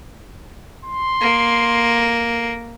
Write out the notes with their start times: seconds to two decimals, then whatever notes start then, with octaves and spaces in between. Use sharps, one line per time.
0.85 C6
1.21 A#3